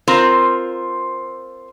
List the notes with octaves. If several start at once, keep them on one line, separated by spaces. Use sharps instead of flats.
C4 F4 A#4 C5